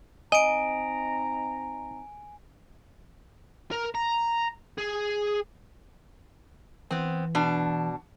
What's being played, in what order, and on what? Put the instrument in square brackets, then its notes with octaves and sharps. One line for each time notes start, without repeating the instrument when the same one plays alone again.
[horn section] C4 D#4 A#5 [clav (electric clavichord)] D#5 [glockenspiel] G#5 D7
[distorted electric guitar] A#4
A#5
G#4
[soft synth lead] E3 [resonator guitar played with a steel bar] B3 C4
[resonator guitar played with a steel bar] B2 D4